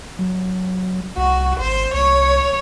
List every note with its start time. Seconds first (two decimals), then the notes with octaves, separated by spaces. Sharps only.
0.19 F#3
1.17 C2 F#4
1.60 G#1 C5
1.94 C2 C#5